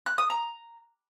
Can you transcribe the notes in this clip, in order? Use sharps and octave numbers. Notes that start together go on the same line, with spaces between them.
F#6
D#6
A#5